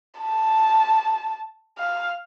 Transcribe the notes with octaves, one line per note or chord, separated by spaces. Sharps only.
A5
F5